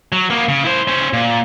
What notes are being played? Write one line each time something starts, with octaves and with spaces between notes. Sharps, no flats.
F#3
A#3 B3
C#3
E4 C5
C#4 C5
A#2